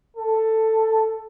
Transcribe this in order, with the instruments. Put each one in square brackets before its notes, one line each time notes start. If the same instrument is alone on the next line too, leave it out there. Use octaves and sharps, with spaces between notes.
[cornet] A4